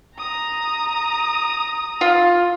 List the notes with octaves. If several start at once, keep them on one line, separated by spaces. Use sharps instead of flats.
A#5 D#6
F4